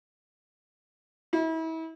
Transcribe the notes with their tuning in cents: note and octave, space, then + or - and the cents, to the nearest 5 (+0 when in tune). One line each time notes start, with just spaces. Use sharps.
E4 -35